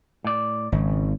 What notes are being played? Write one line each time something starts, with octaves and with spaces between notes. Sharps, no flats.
A2 D5
G#1 C#3